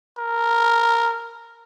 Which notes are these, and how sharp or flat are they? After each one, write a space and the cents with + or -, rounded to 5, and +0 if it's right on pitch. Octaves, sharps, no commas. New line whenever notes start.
A#4 -5